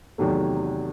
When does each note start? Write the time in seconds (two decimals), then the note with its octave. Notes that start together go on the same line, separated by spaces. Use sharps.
0.18 E2 C3 D#3 F#3 A3